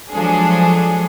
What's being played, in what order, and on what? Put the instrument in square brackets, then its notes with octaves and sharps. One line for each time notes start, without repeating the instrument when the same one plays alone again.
[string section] F3 F#3 G#3 D4 G#4 A4